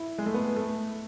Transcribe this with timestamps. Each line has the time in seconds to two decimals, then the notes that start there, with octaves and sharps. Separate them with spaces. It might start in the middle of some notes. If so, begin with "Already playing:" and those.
Already playing: E4
0.18 G#3
0.26 A3
0.34 B3
0.56 A3